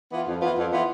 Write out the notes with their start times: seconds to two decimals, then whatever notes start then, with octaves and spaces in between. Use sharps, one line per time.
0.10 E3 B3 F4
0.25 F2
0.40 E3 B3 F4
0.56 F2
0.72 E3 B3 F4